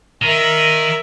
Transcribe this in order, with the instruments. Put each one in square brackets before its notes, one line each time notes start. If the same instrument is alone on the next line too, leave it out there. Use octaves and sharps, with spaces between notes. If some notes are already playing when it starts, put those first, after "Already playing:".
[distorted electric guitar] D#3 D#4 [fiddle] A#4 E5